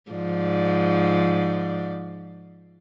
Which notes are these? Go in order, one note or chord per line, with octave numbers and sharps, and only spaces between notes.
G#2 F3 D5